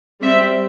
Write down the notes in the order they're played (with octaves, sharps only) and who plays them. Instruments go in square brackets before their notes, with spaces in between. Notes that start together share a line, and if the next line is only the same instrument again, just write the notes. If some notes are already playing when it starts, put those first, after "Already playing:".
[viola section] G3 C4 E5